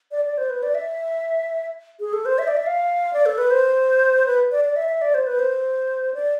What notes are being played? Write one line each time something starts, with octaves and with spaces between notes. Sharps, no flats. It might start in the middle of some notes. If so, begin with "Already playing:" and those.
D5
D5
C5
B4
D5
E5
G#4
A4
C5
E5
D5
E5
F5
D5
A4
B4
C5
B4
D5
D5
E5
E5
D5
C5
B4
C5
D5